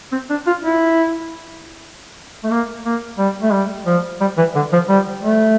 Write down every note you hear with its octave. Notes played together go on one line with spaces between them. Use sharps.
C4
D4
F4
E4
A3
A#3
A#3
G3
A3
G3
F3
G3
E3
D3
F3
G3
A3